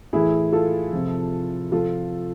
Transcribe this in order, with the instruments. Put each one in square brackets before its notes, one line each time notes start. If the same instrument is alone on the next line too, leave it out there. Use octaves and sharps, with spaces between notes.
[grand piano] A2 E3 E4 G#4
F4 A4
C3 F3
C3 F3 F4 A4